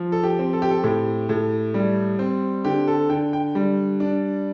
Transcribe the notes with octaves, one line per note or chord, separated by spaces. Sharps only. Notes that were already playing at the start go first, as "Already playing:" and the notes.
Already playing: F3
A4
G4
C4
A4
G4
A4
A2 G4
A2
G3
C4
D3 G4
A4
D3 G5
G5
G3
D4